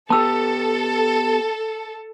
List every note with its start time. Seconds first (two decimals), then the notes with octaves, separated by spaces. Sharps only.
0.10 B3 G4 A4 A5 E6